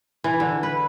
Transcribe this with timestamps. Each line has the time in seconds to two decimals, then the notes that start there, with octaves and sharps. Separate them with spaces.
0.24 E3
0.40 D3
0.63 B4